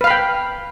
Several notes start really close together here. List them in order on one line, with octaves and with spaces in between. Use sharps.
B4 F5 B5 G5